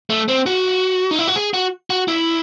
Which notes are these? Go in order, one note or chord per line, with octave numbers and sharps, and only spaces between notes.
A3
C4
F#4
D#4
E4
F#4
G#4
F#4
F#4
E4